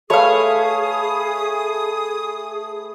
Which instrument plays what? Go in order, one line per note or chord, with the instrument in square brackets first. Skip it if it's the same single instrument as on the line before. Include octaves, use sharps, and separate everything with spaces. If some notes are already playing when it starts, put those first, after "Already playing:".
[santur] A3 B4 E5 [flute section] G#4 D#6 [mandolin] C#5 F5